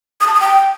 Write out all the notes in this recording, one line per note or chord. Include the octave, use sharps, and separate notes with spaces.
D#6
A5
D#6
G5